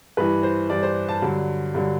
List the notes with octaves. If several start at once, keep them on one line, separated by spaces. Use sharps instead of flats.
G2 E3 B4
C5
G2 E3 D5
C5
A5
G2 D3 F#3
G2 D3 F#3